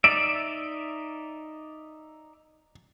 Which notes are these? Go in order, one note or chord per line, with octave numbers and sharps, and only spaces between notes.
D#4 D5 E5 D7